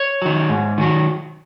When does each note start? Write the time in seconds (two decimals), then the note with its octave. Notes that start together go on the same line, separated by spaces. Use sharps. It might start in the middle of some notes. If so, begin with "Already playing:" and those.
Already playing: C#5
0.22 D#3 F#3
0.49 G#2
0.78 D#3 F#3